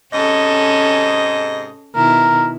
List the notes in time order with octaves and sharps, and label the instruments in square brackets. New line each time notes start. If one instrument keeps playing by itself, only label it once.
[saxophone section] G#2 C3 D#5 [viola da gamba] C#4 A4
[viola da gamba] B2 D#3 E4 [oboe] A#4